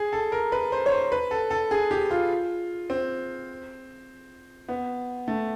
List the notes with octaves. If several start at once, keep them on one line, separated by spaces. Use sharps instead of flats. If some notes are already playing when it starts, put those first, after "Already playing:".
Already playing: G#4
A4
A#4
B4
C5
C#5
C5
B4
A4
A4
G#4
G4
F4
C4
B3
A3